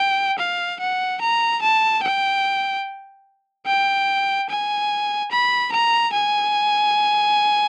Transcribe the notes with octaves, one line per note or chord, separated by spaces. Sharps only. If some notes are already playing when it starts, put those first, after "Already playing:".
Already playing: G5
F5
F#5
A#5
A5
G5
G5
G#5
B5
A#5
G#5